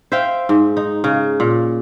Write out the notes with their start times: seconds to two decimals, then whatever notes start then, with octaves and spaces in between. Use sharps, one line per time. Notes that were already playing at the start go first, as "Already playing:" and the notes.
0.12 C5 E5 F5 G5
0.49 G#2
0.77 D#4
1.04 C#3
1.40 A#2